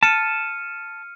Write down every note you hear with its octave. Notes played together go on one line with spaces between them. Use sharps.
A5 F6 C#7 D#7